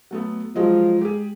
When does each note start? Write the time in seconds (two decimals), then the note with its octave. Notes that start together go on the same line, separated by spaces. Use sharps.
0.11 F#3 A3 B3
0.56 F3 F#3 G#3 D#5
1.01 G#3 G4 G#4